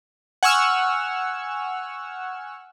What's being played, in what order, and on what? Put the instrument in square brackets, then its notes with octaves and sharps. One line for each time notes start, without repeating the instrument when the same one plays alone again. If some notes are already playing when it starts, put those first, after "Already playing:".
[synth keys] F#5 G#5 C#6 E6 F6